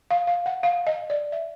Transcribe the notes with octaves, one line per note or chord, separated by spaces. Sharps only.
F5
F5
F#5
F5
D#5
D5
E5